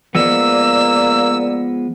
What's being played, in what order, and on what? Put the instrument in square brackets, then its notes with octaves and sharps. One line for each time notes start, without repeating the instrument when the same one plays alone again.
[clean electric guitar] F3 G#3 B3 [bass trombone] A#3 [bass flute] D5 [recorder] E6